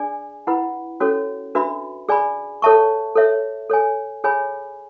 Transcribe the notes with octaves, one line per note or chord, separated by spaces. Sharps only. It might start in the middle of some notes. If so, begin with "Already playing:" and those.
Already playing: D4 G#4 D5 G#5
E4 B4 F#5 B5
C#4 F#4 A4 C#5
D4 F#4 B4 E5 B5
G#4 D5 G#5 B5
A4 C#5 E5 A5 C#6
A4 C#5 E5
A4 C#5 G#5
G#4 C#5 G#5 B5